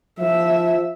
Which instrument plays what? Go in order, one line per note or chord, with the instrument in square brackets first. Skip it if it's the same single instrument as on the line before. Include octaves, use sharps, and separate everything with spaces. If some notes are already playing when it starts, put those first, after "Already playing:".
[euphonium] F3 [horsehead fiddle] E5